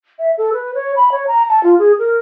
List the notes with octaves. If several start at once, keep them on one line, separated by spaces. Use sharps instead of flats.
E5
A4
B4
C#5
B5
C#5
A#5
A5
F4
G#4
A#4